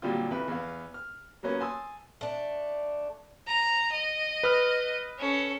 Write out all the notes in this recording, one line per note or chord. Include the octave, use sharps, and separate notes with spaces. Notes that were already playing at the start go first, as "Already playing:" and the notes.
A#2 D3 F#3 G3 C4 F4
F2 E4 B4
E2 B3 F5
F6
F#3 A#3 B3 C#4
G#5 A5 C6 D#6 E6
A3 D4
A#5
D#5
B4 D#6 F6
C#4 A4